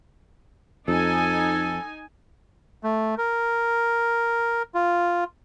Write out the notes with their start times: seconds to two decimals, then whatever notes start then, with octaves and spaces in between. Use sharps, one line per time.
0.88 F2 D#4 A4 G#5
2.83 A3
3.18 A#4
4.74 F4